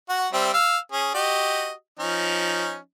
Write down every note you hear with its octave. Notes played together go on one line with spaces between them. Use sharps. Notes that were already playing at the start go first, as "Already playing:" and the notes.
F#4 F#5
G3 C4 E5
F5 E6
C#4 G#4
F#4 G4 D#5
F3 C#4 D#4